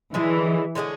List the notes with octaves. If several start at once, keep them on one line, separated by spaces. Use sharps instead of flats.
D3 E3 G#3 C#4 G#4
D3 G#3 C#4 G#4